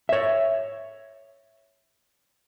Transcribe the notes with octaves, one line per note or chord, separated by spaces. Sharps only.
C#5 E5